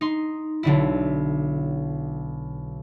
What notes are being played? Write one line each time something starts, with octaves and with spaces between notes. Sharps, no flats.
D#4 C6
B1 D3 E4